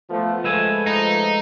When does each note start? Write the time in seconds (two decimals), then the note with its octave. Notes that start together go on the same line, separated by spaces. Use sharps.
0.10 F3 A3 B3
0.44 F3 G#3 A3 B4 E5 G#5
0.87 D#4